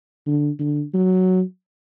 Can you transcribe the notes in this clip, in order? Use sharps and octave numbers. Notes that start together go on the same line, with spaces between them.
D3
D3
F#3